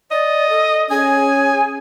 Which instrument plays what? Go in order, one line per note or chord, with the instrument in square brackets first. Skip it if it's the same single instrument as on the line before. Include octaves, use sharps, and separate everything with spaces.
[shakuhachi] D5 [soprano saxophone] D#5
[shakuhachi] A4
[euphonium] C#4 [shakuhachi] G#4 [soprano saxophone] G#5